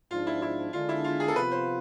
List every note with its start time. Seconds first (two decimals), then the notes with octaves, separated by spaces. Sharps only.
0.11 G#2 F3 G#3 D4 F4
0.27 E4
0.42 E4
0.73 D3 G#3 D4 F4
0.89 E4
1.04 F4
1.20 G#4
1.28 A4
1.36 C3 F3 B3 F4 B4
1.52 C5